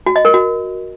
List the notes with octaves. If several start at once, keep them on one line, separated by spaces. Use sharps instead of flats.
F#4
D#5
A#4
F#4